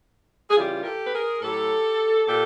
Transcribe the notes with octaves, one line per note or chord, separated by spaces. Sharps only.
G#4
C#3 E3 G3 F4 G4
A#4
G4 A4
B4
G#4 A#4
A2 F#3 G4 A4
A#2 G4 A4